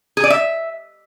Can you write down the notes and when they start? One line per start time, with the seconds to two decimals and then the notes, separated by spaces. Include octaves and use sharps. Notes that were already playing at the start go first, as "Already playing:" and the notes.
0.17 G#4
0.24 D5
0.30 E5